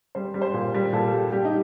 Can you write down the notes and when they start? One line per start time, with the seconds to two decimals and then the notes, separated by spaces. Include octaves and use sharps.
0.15 G3 C5
0.34 G3
0.41 C5
0.54 A#2
0.74 G3
0.93 A#2 A4
1.13 G3 G4
1.32 G3 G4
1.45 D#4